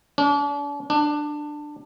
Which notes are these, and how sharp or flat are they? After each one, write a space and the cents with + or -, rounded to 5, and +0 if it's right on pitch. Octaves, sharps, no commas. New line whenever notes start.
D4 -40
D4 +15